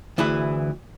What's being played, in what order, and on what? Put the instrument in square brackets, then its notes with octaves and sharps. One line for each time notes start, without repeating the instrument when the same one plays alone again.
[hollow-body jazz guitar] D2 E3 E4 G#4